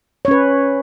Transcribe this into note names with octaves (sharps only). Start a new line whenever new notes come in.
C#4 B4 C#5